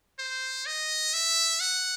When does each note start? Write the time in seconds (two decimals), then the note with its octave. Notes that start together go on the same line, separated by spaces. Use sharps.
0.19 C5
0.66 D#5
1.14 E5
1.60 F#5